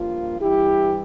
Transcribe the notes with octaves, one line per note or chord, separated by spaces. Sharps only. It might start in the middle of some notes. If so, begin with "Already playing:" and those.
Already playing: G2 F3 A#3 F4
G2 E3 G3 E4 G4